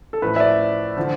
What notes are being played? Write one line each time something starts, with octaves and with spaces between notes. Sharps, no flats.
A4
A2 F3 B4
E5
D5
D3 F3